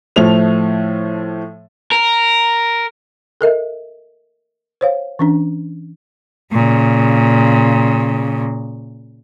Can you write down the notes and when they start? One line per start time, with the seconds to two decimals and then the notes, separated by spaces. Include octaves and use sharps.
0.16 A2 F3 A3 F7
1.92 A#4
3.41 A4 A#4 D#5 E5
4.81 C5 C#5 F5
5.19 E3 C#4 D4
6.53 A#2 C#3